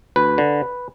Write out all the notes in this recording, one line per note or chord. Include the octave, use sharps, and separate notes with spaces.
D2 B4
D3